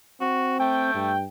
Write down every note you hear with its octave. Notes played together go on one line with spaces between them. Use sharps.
C4 F#4
A3 G5
G2